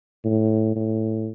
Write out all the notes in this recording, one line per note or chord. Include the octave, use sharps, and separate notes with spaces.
A2
A2